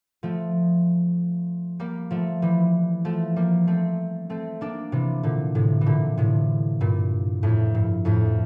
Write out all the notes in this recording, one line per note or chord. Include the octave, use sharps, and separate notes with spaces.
F3 A3
G3 A#3
F3 A3
E3 G3
F3 A3
G3 A#3
A3 C4
A3 C4
A#3 D4
C3 E3
A#2 D3
A2 C3
E3
A#2 D3
A2 C3
G2 A#2
F2 A2
G2
F2 A2